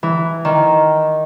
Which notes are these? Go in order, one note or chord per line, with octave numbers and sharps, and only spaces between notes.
E3
D#3